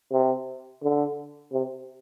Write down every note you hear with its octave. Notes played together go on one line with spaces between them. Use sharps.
C3
D3
C3